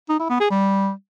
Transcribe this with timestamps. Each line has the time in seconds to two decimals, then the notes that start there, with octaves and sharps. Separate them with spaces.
0.09 D#4
0.20 E4
0.30 B3
0.40 G#4
0.51 G3